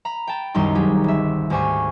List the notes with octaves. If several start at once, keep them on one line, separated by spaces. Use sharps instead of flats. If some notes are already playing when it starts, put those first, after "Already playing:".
A#5 B5
G5 A5
C2 F#2 D#3 G3 D#4 C6
F#3 G4 G#4
G1 E5
D2 G#2 G4 C5 G#5 C#6